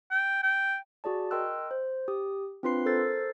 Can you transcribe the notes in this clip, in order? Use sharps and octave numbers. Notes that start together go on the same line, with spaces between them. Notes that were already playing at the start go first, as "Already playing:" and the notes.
G5
G5
F#4 G#4 D5 A5
A#4 D#5 G5 C6 E6 F#6
C5
G4 D#6
C4 D4 F4 B4 C6 C7
A4 A#4 C5 E6 A6 C7